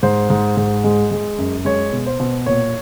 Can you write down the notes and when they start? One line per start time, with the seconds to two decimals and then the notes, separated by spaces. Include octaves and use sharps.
0.03 G#2 C5
0.30 G#2
0.57 G#2
0.84 G#3
1.11 G#3
1.38 F#2
1.65 G#3 C#5
1.92 B2
2.06 C5
2.20 B2
2.46 A#2 C#5